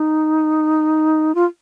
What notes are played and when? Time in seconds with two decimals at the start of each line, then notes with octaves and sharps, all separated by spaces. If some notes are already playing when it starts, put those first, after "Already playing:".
Already playing: D#4
1.35 F4